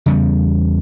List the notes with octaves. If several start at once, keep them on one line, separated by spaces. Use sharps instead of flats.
E2 C#3 G3 B3